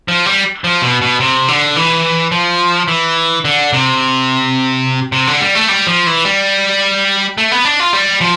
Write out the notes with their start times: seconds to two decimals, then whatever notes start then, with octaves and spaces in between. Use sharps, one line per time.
0.08 F3
0.26 G3
0.64 F3
0.82 B2
1.02 B2
1.20 C3
1.48 D3
1.76 E3
2.32 F3
2.88 E3
3.45 D3
3.73 C3
5.12 C3
5.27 D3
5.41 G3
5.55 A3
5.69 G3
5.87 F3
6.07 E3
6.25 G3
7.38 A3
7.52 B3
7.65 D4
7.80 F4
7.93 G3
8.21 F3